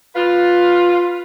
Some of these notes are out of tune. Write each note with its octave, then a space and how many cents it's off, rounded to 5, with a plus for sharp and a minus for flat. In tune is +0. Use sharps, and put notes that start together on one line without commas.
F4 +10 B4 +0